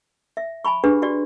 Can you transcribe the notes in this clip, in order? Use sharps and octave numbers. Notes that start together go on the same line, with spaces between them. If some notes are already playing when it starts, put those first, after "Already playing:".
E5
G#5 A5 B5 C#6
D4 G4 G#4 B4
F#4 G4 D5